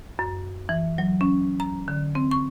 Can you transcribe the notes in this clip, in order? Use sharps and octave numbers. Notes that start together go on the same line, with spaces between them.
F#2
E3
F#3
C#4
A#5
D3
C4
C#6